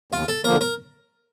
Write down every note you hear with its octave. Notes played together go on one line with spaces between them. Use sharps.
D#2 F4
A4
D3 F3 A#3 A#4
A#4